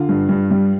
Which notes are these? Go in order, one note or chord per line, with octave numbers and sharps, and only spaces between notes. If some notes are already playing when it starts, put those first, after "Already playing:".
Already playing: D3 F4
G2
G2
G3